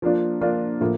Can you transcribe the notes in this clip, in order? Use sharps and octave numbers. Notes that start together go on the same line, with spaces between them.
F3 A#3 D4 F4
F3 A#3 D4 F4
A2 F3 A#3